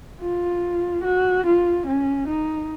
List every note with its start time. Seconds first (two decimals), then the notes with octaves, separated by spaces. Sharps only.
0.21 F4
1.04 F#4
1.46 F4
1.86 C#4
2.28 D#4